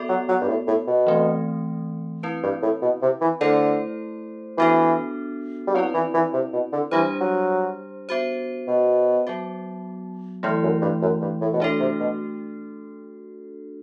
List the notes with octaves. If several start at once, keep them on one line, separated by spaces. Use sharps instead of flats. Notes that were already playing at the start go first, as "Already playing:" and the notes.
Already playing: B3 F#4 A4 D5
F#3
F#3
G2
A2
A2
B2
E3 A3 C4
C4 E4 B4
G2
A2
B2
C3
E3
D3 A3 E4 A4 C5
E3 B3 D4 F#4 A4
G3
F#3 C4 E4 B4 D5
E3
E3
C3
B2
D3
E3 G3 D4 G4 C5
F#3
B3 F#4 C5
B2
F#3 B3 F#4
A2 E3 A3 E4
F#2
G2
F#2
G2
A2
B2
A2 A3 D4 F#4 A4
C3
B2